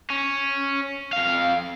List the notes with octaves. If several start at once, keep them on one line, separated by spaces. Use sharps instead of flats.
C#4
F2 F5